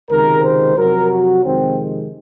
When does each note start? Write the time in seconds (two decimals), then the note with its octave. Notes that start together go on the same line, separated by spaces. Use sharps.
0.10 C#2 C3 D#3 G#3 A#4
0.43 C5
0.77 F2 C3 F#3 A#4
1.10 F#4
1.44 F2 C3 D#3 G#3 C4